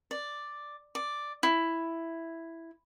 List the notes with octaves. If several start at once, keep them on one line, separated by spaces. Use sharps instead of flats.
D5
D5
E4